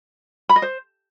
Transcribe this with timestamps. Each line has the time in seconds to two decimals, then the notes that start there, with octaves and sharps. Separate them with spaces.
0.49 B5
0.56 D#5
0.62 C5